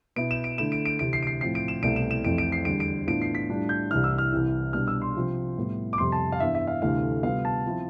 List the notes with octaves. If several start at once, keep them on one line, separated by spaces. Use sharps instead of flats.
B2 B3 E4 D7
E7
D7
D3 A3 E4 E7
D7
D7
D2 C3 E3 D7
C7
D7
C7
A2 F3 C4 E4 C7
D7
E7
C2 B2 A3 C4 E4 D7
E7
E7
F2 E3 A3 C4 E4 D7
D7
C7
E2 D3 G3 D7
D7
A2 E3 B3 D4 F4 D7
C7
B6
A2 G3 D4 F4
G6
C2 C3 E3 F6
E6
F6
C2 C3 E3
B2 G3 D4 F6
E6
C6
C3 F3 C4 F4
A2 G3 B3 E4
D6
F2 C3 G3 C6
A5
F5
G2 E3 B3 E5
E5
F5
D2 C3 E3 A3 F5
C3 G3 B3 F4 F5
A5
F3 C4 E4